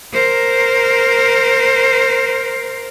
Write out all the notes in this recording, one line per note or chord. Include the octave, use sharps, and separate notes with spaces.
A#4 C5